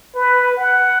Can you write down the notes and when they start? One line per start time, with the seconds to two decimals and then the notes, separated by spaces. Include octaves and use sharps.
0.15 B4
0.57 F#5